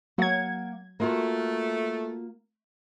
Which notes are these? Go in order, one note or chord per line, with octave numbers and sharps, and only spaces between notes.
F#3 A#3 F#5 G#6
A3 A#3 F4 F#4